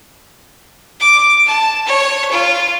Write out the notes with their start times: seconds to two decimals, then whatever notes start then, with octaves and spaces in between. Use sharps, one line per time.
1.00 D6
1.46 A5
1.87 C#5
2.31 F4